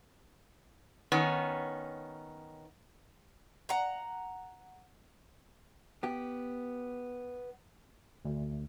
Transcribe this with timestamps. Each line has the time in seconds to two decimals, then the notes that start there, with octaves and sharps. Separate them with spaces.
1.12 D#3 B3 C#4
3.69 F#5 A#5
6.03 B3 G4
8.25 D2